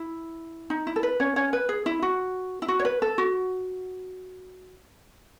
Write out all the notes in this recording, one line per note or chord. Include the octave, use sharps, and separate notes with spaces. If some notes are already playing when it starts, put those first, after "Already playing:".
Already playing: E4
D#4
E4
A4
B4
C#4 C#5
C#4 C#5
B4
G#4
E4
F#4
E4
F#4
C#5
B4
A4
F#4